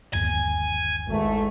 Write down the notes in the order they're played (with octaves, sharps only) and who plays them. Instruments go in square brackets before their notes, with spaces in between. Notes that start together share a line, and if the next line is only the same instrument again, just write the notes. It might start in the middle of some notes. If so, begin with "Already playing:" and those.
[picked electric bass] G1 D#2 [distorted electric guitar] G#5
[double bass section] G#1 [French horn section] E2 G#2 A3